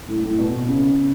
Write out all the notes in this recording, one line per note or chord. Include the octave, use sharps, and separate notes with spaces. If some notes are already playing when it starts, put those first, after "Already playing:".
A2
A2
B2
C#3